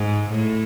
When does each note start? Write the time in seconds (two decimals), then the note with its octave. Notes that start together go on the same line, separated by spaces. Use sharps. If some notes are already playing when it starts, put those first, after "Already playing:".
Already playing: G#2
0.30 A2